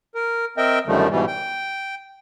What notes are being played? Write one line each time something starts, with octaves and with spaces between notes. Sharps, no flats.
A#4
C4 A#4 D#5 E5 G5
F#2 D3 D#3 F3 G3 A3
G#2 B2 E3 G3
G5